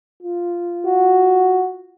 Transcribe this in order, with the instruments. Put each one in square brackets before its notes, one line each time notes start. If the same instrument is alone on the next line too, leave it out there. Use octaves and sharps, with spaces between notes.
[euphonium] F4
[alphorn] F#4